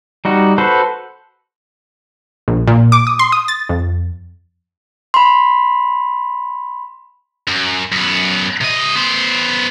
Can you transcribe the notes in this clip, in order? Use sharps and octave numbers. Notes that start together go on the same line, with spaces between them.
G3 D#4 F#4
F#4 A4 B4 C5
A#1
A#2
D6
D#6
C6
D#6
A6
F2
B5 C6
F#2
F#2 B3
C3 D#5
B3 C5